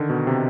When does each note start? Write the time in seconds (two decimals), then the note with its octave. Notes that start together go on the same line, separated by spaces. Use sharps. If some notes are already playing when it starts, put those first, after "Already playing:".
Already playing: D3 D#3
0.10 B2
0.27 C3